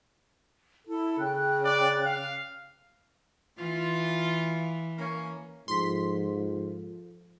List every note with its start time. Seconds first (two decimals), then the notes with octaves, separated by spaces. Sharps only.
0.87 E4 A4
1.19 C#3 G5 F#6
1.65 D5
2.06 F5
3.59 E3 F4
4.98 A#3 C#4
5.68 G#2 F3 F4 A4 C6 B6